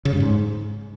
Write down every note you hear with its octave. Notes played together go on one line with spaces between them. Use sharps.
C#3
G2
G#2